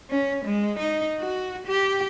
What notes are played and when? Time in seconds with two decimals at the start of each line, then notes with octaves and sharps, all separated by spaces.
0.10 C#4
0.45 G#3
0.78 D#4
1.19 F#4
1.66 G4